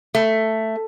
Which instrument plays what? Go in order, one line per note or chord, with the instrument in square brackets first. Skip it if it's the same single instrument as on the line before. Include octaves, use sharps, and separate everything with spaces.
[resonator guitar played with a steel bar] A3